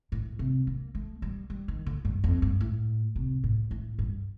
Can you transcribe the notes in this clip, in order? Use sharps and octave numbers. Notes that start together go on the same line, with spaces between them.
A2
C3
A#3
A3
G3
G3
D#3
D3
G2
F2
G2
A2
C3
A2
A2
G2